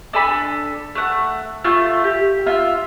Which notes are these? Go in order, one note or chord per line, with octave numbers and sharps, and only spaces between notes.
D4 A4 G#5 B5
A3 F#5
A3 F4
G4
F4 E5